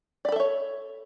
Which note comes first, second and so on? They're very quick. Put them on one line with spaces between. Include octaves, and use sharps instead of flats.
D5 B5 A4 E5 C#5